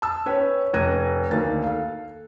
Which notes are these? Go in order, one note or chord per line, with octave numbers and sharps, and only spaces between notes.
A5 E6
C#4 B4 C#5 G5
F1 C#4 F#6 G#6 A#6 D#7
D2 D#3 A#3 D4 A6
A4 F5